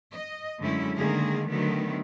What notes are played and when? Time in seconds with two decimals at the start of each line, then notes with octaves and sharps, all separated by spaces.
0.13 D#5
0.59 F#2 D3 G#3 A3 C#4 E4
0.96 D3 D#3 G#3 A#3 G#4
1.48 D3 D#3 F#3 A3 B3